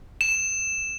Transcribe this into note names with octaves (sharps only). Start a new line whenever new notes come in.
E7